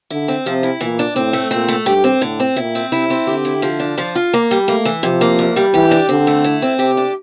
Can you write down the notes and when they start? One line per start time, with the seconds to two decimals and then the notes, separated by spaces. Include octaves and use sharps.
0.10 D3 E4
0.28 C4
0.46 C3 F3
0.63 E4
0.81 A#2 E3
0.99 D4
1.16 A2 C4
1.33 A3
1.51 A#2 C4
1.69 A3
1.86 G2 G4
2.04 C4
2.21 A2 D3
2.40 C4
2.56 A#2 E4
2.75 C4
2.92 C3 E4
3.10 C4
3.27 D3 G4
3.45 E4
3.62 F3
3.80 D4
3.98 F3
4.15 F4
4.34 A#3
4.51 G3
4.68 A3 A#3
4.85 E3
5.03 C3 F3
5.21 A#3
5.39 E2
5.56 G3
5.74 E3 G4
5.91 D4
6.09 D3 C4
6.27 A3
6.44 E4
6.62 C4
6.79 C3 G4
6.97 D4